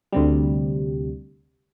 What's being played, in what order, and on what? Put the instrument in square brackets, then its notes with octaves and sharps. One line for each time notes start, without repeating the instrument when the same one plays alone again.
[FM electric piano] D2 C3 G3